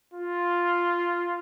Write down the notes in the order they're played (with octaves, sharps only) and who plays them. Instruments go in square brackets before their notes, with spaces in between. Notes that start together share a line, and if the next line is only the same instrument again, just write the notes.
[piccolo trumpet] F4